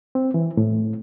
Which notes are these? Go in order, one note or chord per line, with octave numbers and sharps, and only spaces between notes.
C4
E3
A2